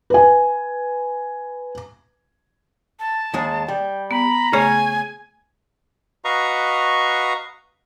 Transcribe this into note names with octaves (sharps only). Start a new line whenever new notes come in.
B4 G#5
A5
D#2 G#3 G#4
G3 G5
B3 A#5 B5
C#3 A3 G#4 C#5 G#5
F#4 B4 D#5 F5 A#5 C#6